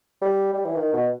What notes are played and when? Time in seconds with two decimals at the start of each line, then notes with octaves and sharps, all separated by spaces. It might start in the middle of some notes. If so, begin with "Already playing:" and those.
0.22 G3
0.53 G3
0.65 E3
0.76 D#3
0.93 B2